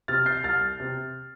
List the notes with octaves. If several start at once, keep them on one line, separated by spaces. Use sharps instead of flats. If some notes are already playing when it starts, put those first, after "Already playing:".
C3 F6 A6
G6 C7
C2 F6 A6
C3